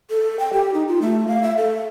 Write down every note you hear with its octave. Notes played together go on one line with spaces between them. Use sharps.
A4
G5
G4
D#4
F4
A3
F5
E5
A4